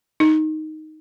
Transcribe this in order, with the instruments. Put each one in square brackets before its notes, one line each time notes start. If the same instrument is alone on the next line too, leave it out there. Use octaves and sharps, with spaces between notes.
[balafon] D#4